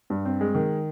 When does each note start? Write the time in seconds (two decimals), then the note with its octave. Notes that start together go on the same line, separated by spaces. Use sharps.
0.10 G2
0.25 C4
0.41 G#3
0.55 D#3